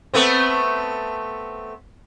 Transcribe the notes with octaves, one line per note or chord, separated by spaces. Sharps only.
A3 B3 C4